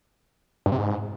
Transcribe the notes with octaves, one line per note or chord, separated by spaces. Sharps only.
G2
C3
G#2